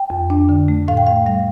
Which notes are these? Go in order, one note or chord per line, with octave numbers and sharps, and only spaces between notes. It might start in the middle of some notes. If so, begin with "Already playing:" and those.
Already playing: G5
F2
D4
D3
A3
A2 F5
G5
A2 F5
G3 F5